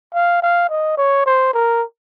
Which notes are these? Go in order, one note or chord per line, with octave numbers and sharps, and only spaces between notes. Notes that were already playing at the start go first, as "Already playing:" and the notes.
F5
F5
D#5
C#5
C5
A#4